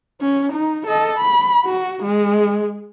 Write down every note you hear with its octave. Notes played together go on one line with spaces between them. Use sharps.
C#4
D#4
A4 D#5
B5
F#4
G#3